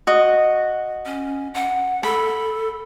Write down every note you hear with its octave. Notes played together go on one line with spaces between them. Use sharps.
F#4 D#5
C#4
F#5
A4 B5